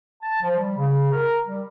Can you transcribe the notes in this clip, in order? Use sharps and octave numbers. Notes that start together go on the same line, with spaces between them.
A5
F3
G3
C#3
A#4
G3